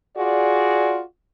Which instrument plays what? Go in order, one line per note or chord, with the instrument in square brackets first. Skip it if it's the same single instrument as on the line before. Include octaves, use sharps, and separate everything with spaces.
[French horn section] F4 F#4 G#4 D5